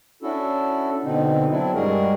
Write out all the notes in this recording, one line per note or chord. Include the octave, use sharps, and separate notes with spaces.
C#4 D4 E4 F#4 A4
B2 D3 C4 D#4
F#3 C4 D4 E4
G2 G3 G#3 F#4 G#4 A#4